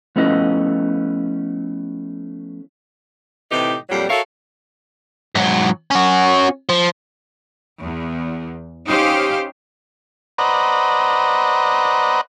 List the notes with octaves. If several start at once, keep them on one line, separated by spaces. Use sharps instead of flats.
F3 A3 B3 C#4 E4 D#5
A2 C3 E3 D#4 G4
F2 A#2 F#3 G3
F#4 A4 A#4 C#5 E5 F5
G#2 F#3
C#4 F#4
F3
E2
C#4 D#4 G4 C5 F5
B4 C5 D5 D#5 F#5 A#5